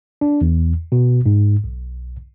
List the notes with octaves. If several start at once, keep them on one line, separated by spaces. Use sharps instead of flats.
D4
E2
B2
G#2
B1